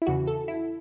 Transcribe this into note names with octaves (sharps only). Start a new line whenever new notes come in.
E4
E2 C#3 E3 F#4
A4
E4